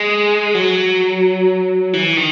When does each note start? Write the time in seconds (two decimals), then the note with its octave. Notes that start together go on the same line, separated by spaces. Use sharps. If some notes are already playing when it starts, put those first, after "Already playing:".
Already playing: G#3
0.55 F#3
1.93 E3
2.17 D#3